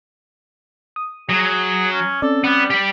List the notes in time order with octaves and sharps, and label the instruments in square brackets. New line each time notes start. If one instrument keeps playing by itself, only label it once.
[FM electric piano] D#6
[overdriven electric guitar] F#3 [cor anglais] G#4
[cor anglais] C#4
[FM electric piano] C4 C#4 D5 [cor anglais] A4
[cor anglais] G3 [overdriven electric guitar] B3
[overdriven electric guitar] G4 D5